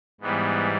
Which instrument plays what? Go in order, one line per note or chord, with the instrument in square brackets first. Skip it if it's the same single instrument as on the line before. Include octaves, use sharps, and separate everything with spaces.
[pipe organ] G#2 E3 G3 B3